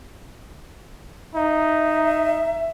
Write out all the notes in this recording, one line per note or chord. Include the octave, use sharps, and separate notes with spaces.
D#4 E5